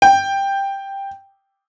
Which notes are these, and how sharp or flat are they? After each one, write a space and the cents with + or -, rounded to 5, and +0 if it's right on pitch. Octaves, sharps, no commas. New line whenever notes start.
G5 +5